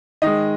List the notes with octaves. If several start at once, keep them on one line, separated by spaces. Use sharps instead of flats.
D#3 G#3 D#5